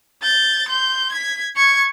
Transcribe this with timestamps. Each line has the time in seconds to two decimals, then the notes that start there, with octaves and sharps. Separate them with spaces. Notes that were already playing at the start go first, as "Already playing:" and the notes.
0.23 G6 A6
0.68 C6 G6
1.12 G#6 B6
1.56 C#6 G#6